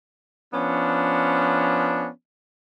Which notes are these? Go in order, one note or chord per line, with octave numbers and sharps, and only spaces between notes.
F3 B3 C#4 D4